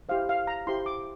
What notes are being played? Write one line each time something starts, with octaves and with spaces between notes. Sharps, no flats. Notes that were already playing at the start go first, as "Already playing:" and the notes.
E4 G4 C5 F5
F5
A#5
E4 G4 C5 C6
D6